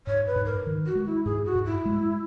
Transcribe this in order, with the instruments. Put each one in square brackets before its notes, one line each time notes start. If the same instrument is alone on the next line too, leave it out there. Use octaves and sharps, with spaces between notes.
[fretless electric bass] G#2 [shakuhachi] C#5
[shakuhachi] B4
[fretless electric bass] G#2
[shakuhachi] A#4
[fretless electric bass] D#3
[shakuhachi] F#4
[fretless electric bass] G#3
[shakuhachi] E4
[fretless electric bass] G#2 [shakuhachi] G#4
[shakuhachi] F#4
[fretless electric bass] G#2
[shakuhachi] E4
[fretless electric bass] G#3